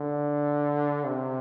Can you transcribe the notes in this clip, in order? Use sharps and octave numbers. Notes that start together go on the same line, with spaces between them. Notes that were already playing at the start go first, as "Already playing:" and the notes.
Already playing: D3
C3